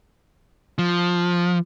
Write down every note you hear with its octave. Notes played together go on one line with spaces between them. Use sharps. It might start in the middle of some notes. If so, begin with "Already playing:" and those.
F3